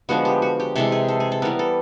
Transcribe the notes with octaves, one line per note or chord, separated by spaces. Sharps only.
D3 F3 G#3 B3 F#4
G4
F#4
G4
C3 E3 G#3 A4
G#4
A4
G#4
A4
E3 G3 B3 A#4
A4